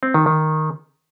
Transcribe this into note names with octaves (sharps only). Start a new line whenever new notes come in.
C4
D#3
D#3